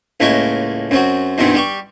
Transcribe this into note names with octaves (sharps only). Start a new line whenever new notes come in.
C#2 A2 G#3 A#3 A#4 C#6
F#2 C4 F#4
E2 G2 B2 D#3 C4
G3 G4 C#6